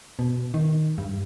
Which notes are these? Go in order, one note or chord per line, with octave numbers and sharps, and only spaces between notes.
B2
D#3
G2